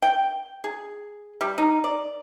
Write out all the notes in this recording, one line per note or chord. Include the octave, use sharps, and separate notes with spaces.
G5
G#4
G3
D#4
D5